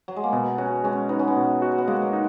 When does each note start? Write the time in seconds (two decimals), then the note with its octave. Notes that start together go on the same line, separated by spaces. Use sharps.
0.08 F#3
0.16 G#3
0.24 A#3
0.33 B2 B3
0.58 C#4 F#4
0.84 G#3 C#4
1.09 B3 D#4
1.19 C#4
1.28 B3
1.36 B2
1.62 F#4
1.78 B3
1.87 G#3 A#3
2.02 F#3
2.13 D#4